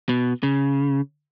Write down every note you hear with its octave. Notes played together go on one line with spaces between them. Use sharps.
B2
C#3